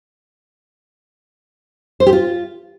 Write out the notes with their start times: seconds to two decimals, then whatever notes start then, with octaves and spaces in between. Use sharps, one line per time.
2.00 C5
2.06 G4
2.13 F4